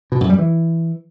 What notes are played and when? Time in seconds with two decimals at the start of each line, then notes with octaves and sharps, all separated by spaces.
0.12 B2
0.21 F#2
0.30 G3
0.38 E3